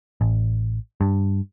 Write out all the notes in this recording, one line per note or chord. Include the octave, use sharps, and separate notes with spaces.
A1
G2